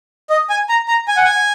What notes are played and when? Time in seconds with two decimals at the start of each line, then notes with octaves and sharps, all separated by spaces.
0.30 D#5
0.50 G#5
0.69 A#5
0.88 A#5
1.08 G#5
1.17 F#5
1.25 G#5